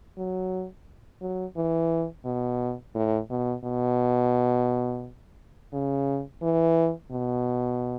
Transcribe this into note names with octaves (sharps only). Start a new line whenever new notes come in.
F#3
F#3
E3
B2
A2
B2
B2
C#3
E3
B2